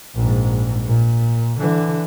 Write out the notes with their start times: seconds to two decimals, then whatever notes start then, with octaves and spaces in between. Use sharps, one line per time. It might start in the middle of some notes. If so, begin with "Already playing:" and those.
0.15 A#1 G#2
0.86 A#2
1.59 D3 E3